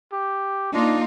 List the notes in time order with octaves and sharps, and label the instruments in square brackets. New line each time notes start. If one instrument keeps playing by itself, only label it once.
[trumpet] G4
[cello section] A#3 D#4 F4 [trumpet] D4